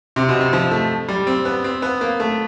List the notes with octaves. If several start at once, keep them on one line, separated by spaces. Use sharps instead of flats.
C3
B2
C3
F3
A3
G3
C4
B3
C4
B3
A#3
A3